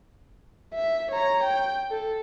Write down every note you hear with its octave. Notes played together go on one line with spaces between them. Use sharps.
E5
C#5 A#5
G5
A4